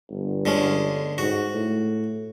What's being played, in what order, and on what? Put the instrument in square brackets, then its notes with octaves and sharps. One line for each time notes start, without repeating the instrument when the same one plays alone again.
[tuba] G1
[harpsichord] D3 G#3 C#4
[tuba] G#2 [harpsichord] F#4
[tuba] A2